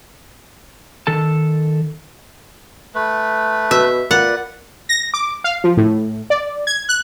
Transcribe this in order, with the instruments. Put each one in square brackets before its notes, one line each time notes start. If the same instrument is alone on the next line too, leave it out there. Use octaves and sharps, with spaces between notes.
[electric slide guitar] D#3 A4 A5
[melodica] A3 B4
[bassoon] B2 [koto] E5
[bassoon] A#2 [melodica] B4 D5 [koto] F#5
[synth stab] A#6
D6
F5
F3
A2
D5
G#6
F#6